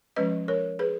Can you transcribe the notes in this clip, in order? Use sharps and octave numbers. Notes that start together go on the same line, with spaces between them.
F3 G#3 C#4 B4 D#5
A#4 C#5
G#4 B4